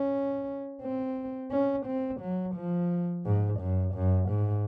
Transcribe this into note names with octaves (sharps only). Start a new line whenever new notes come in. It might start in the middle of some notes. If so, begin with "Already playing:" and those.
Already playing: C#4
C4
C#4
C4
F#3
F3
G#2
F#2
F#2
G#2